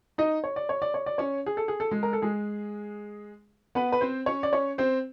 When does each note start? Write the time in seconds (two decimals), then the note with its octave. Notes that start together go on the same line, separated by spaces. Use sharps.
0.18 D#4 D#5
0.44 C#5
0.56 D5
0.69 C#5
0.82 D5
0.94 C#5
1.06 D5
1.18 C#4 C#5
1.46 G#4
1.57 A4
1.68 G#4
1.80 A4
1.91 G#3 G#4
2.03 A#4
2.13 A4
2.22 G#3 G#4
3.75 B3 B4
3.92 B4
4.01 C4 C5
4.26 C#4 C#5
4.43 D5
4.53 C#4 C#5
4.78 C4 C5